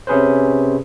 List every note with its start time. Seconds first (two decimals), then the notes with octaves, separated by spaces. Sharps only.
0.07 C3 C#4 G#4 B4 C5